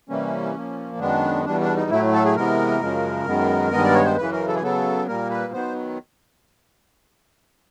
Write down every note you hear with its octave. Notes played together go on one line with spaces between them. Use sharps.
C3 E3 G3 A#3 C#4
A#2 F3 A#3
F#2 D#3 G#3 B3 D4
E2 B2 G3 D4
D4
D#4
A2 F#3 A3 E4
A4
G#4
C3 E3 G#3 B3 A#4
F#2 C#3 F3 G#3
F#2 D#3 G#3 B3
G2 D#3 G#3 B3 D#5
D5
C#5
C5
F#2 C#3 E3 B4
A#4
A4
G#4
C#3 F#3 B3 A4
A#2 G3 A#3 A#4
B4
D#3 F#3 B3 C5